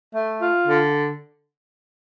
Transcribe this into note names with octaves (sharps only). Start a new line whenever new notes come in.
A3
F4
D3